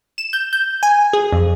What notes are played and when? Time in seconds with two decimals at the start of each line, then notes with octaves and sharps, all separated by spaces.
0.18 E7
0.33 G6
0.53 G6
0.83 G#5
1.13 G#4
1.32 F2